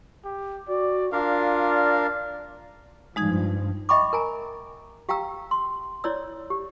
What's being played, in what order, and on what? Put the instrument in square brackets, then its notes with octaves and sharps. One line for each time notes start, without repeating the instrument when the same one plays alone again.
[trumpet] G4
[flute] F#4 [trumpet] D5
[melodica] D4 A#4 F5 [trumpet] F4 [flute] D5
[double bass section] G2 F3 [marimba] G#3 D#4 G#6
[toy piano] D#5 E5 G5 B5 C#6 D6
A#4 G#5 A#5
G4 F5 G5 A#5 E6
C6
E4 C#5 D5 E6
G4